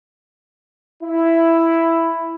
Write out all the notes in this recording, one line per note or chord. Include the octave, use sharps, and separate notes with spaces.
E4